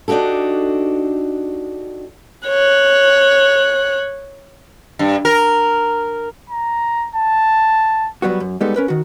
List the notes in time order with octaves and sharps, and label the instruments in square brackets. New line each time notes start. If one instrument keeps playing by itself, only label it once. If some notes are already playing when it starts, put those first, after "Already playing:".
[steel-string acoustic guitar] D4 D#4 F#4 G4 A4
[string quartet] C#5 F#6
[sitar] G2
A#4
[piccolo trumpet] A#5
A5
[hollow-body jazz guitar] F#3 G3 B3 F#4
F#2
G3 G#3 B3 D#4 G4 A4
C#4 A#4 B4
D#3 F#4